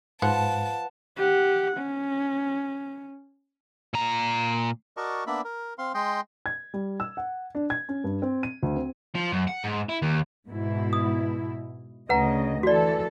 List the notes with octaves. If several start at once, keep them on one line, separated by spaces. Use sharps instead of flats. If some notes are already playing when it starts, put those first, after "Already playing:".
G#2 F3 B4 F#5 A5
G4 F#5
C#4
A#2 A#5
F#4 A#4 D5 D#5 A5 C#6
A#3 B3 D4 D5 E5 B5
A#4
C4 F5 C6
G#3 D#5 G5 C6
G#6
G3
E6
F#5
D4
G#6
C#4
G2
C4
D#7
D2
C4
F3
F#2
F#5
G#2
E4
D#2
G#2 B2 E4
D#6
D2 C#3 B4 D#5 F#5 A#5
E3 F#4 A4 D5